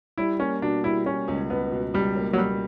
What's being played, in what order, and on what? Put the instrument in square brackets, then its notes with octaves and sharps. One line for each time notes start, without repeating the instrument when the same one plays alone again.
[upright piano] G3 [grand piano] E4
[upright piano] A#3 [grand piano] C#4
[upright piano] B2 [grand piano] D4
[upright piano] G3 [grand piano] E4
[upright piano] B2 [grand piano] C#4
[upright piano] C#2
[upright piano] C#2 [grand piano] B3
[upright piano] B2
[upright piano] C#2 [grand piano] G3
[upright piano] A#3
[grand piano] F#3
[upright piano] B2 [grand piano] G3